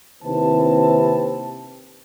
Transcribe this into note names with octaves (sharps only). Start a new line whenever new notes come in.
D#2 C3 C4 E4 B4 A5